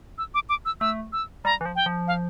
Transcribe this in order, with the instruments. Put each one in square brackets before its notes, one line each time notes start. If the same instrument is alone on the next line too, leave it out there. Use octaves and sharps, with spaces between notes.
[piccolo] E6
D6
D6
E6
[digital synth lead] A3 [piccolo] E6
[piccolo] E6
[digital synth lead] G3 [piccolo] A#5
[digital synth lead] E3
F3
[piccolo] G5
[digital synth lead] F3
[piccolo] F5